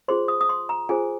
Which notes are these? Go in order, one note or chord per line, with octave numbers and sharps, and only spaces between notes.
F4 G#4 C5 C6
D#6
D#6
C6
A#5
F4 G#4 C5 G#5